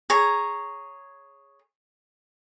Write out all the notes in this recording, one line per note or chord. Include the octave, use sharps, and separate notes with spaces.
G#4 C#5 A#5